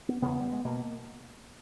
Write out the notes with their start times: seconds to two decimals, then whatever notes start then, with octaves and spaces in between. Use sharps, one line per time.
0.09 B3
0.22 E2 C#3 B3
0.40 G3
0.52 G#3
0.65 B2 A#3